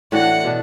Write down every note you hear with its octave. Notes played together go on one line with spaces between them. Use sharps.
A2 E3 D4 F#4 F#5
B2 B3 D4